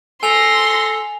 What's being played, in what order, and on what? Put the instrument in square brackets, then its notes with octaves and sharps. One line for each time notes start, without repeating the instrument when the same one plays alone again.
[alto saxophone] A4 [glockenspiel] G#5 F7 G7 [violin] C6 A#6